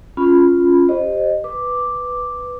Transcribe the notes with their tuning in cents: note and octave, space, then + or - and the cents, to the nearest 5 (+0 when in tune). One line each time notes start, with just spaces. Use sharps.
C#4 +0 F4 +0 B5 +0
G4 +0 C5 +15 D#5 -15
B4 +0 D6 +0